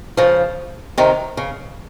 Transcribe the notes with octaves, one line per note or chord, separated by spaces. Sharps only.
C#3 F3
C3 D#3
C#3